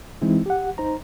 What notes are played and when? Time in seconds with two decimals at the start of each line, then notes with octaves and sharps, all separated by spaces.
0.22 E3 G#3 C4 D#4 E4
0.46 G4 F#5
0.78 D#4 C5 A#5